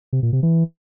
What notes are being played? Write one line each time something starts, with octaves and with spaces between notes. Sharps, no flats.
C3
A#2
C3
E3